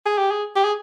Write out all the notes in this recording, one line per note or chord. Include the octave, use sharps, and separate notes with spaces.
G#4
G4
G#4
G4
G#4